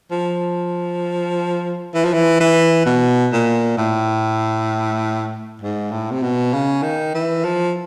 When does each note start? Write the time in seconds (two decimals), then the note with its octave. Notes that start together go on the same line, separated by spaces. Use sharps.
0.11 F3
1.94 E3
2.05 F3
2.13 E3
2.40 E3
2.86 B2
3.33 A#2
3.77 A2
5.61 G#2
5.91 A2
6.11 C3
6.22 B2
6.53 C#3
6.83 D#3
7.14 E3
7.44 F3